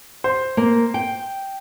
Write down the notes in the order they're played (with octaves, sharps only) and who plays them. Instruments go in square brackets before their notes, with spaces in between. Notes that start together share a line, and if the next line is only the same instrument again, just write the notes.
[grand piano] C5
[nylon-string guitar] A#3
G5